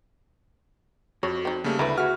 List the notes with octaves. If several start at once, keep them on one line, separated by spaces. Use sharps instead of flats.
F2 F#4 C#5
C4 D#4
C#3 G3 A3 A#3
D2 C#3 C4 E4 B4 A#5
F#4 G#4 E5 F6